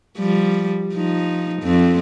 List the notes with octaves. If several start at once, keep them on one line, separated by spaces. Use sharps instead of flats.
F3 G3
F3 D#4
F2 C4